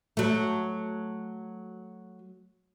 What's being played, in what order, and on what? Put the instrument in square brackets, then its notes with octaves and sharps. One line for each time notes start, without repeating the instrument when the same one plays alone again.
[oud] F#3 A3